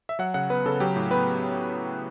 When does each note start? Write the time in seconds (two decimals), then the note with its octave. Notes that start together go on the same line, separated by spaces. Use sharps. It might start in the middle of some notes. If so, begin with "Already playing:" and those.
0.09 E5
0.19 F#3 F#5
0.34 C#3 F#5
0.50 B3 B4
0.66 C#3 A4
0.80 F#3 G4
0.96 A2
1.11 B3 B4